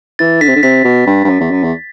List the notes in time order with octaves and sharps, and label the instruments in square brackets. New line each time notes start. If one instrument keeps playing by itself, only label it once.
[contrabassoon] E3 [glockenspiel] A6
[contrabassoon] D3 [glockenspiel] B6
[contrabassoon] C3
D3
[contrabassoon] C3 [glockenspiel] B6
[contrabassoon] B2
G2
G2
F#2
E2
F#2
E2